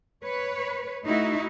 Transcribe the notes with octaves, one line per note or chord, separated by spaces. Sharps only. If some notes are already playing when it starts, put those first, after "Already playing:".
B4 C#5
A3 D#4 E4 F#4